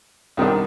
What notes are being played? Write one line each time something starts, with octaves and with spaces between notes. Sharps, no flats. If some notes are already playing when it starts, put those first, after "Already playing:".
C2 C3 D#3 B3 D4